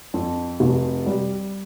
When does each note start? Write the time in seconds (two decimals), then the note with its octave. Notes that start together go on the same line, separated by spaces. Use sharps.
0.14 F2
0.60 F1
1.06 G3